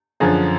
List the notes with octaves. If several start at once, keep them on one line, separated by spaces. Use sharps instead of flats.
F#2 D3 F3 G#4